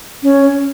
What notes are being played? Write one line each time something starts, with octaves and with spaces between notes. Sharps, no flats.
C#4